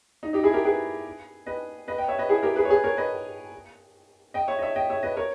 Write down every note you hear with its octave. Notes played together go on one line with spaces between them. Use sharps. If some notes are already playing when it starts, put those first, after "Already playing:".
D#4
D#4 G4
E4 G#4
G4 A#4
G#4 B4
B4 D#5
B4 D#5
D#5 G5
C#5 E5
B4 D#5
E4 G#4
G4 A#4
G#4 B4
C#5
G#4 B4
A#4 C#5
B4 D#5
D#5 G5
C#5 E5
D#5
C#5 E5
D#5 G5
C#5 E5
B4 D#5
A#4 C#5